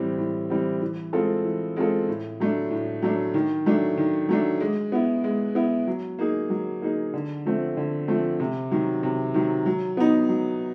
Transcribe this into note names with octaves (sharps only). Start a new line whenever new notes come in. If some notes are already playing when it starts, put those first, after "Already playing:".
Already playing: A2 E3 G3 C4
A2
E3 G3 C4
E3
G#3 C4 F4 A4
E3
G#3 C4 F4 A4
A2
F#3 A3 D4
A2
F#3 A3 D4
D#3
F#3 A3 D4
D#3
F#3 A3 D4
G#3
B3 E4
G#3
B3 E4
F#3
A#3 D#4 G#4
F#3
A#3 D#4 G#4
D3
F3 A3 C4
D3
F3 A3 C4
C3
D#3 F#3
C3
D#3 F#3
F#3
B3 D#4
F#3